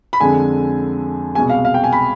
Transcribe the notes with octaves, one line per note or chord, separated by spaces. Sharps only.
B5
F2 D3 G#3 G#5
C2 B2 G#3 G#5
F5
F5
G5
G#5
B5